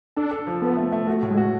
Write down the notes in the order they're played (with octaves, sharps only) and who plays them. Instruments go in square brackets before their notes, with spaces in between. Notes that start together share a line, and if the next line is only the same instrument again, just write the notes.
[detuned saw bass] D4 [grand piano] A4
[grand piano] A4
F3
[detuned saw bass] B3 [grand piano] A4
[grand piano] A3
A3
[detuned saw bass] A3 [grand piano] F#4
[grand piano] A2
[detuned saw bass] G#3
[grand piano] F#4